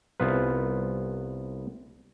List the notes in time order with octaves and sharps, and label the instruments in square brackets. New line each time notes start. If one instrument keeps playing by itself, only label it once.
[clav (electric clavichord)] C2 B3 F4 B4